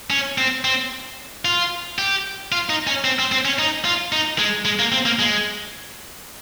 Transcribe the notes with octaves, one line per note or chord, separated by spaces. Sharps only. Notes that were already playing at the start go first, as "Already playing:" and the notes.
C#4
C4
C4
F4
G4
F4
D#4
C#4
C4
C4
C4
C#4
D#4
F4
D#4
G#3
G#3
A#3
C4
A#3
G#3